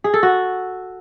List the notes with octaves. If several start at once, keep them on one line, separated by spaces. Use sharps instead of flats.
G#4
A4
F#4